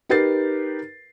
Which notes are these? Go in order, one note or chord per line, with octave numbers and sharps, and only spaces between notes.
D#4 G4 A#4 B4 A6 C7